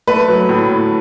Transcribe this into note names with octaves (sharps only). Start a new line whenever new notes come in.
A3 B4
F#3
A2
A2